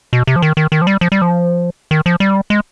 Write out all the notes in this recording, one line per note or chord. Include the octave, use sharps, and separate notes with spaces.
B2
C3
F3
D#3
D#3
D#3
F3
G3
F3
G3
F3
D#3
F3
G3
G#3